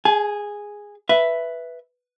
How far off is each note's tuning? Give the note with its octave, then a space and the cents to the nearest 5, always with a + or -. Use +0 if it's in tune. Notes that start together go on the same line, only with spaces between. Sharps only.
G#4 -5 G#5 +45
B4 +0 E5 +5